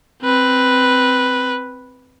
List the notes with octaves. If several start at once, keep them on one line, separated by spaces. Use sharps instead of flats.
C4 B4